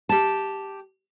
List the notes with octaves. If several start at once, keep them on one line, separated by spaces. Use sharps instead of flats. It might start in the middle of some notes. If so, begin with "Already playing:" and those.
G4 A5